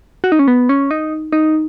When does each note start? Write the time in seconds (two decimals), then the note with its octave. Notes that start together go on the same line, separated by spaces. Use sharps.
0.24 F#4
0.32 D#4
0.39 C#4
0.48 B3
0.69 C#4
0.91 D#4
1.32 D#4